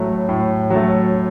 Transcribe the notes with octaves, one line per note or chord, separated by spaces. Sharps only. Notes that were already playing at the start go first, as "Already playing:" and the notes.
Already playing: A2 F#3 A3
A2
F#3 A3